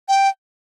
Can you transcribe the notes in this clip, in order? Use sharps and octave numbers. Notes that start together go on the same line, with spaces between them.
G5